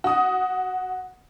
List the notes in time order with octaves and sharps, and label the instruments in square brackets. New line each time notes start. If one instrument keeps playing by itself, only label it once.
[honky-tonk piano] F#4 D#6